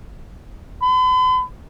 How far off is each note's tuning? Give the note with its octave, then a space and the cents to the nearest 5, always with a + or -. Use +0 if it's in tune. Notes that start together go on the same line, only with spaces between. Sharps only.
B5 +45